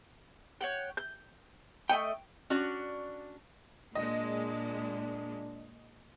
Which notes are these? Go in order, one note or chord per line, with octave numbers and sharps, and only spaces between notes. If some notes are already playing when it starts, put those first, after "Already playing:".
C#5 F#5 G5
G6
A3 D#5 G5 C#6
C#4 D4 F#4 D5
A#2 G#3 D4 D#5